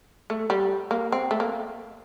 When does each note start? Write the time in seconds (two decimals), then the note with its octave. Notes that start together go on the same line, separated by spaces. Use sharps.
0.30 A3
0.50 G3
0.91 A#3
1.12 C4
1.31 A3
1.40 A#3